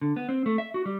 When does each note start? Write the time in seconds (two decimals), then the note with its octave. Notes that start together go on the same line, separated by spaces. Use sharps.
0.02 D3
0.16 B3
0.29 C4
0.46 A3
0.58 E5
0.74 F#4
0.86 G3